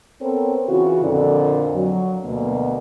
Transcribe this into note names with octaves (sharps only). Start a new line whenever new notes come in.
B3 C4 A4 A#4 C5 C#5
C#3 E3 F4 F#4
F2 A#2 D3
F#3
D2 B2 A#3